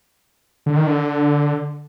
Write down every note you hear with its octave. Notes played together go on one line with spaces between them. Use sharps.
D3
D#3
D3